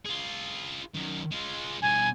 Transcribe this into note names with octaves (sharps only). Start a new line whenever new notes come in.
F4 G#4
F#2 D#3
G#3 F4
G2 B2 G#5